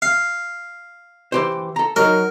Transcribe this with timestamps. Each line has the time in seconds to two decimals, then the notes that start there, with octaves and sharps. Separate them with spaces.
0.02 F5
1.32 E3 G4 C5
1.76 A4 A#5
1.96 F#3 D#4 A#4